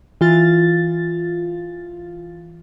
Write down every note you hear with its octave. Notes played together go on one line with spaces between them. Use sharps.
E3 F4 A6